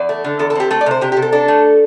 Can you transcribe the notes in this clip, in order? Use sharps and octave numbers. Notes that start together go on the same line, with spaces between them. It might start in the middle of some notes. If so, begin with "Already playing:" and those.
Already playing: E2 D5
A3
D3
E2 A4
A4
C4 G4
A3 A4
D5
C3 C5
C3 G4
C3 G4
A4
D4 A4
A3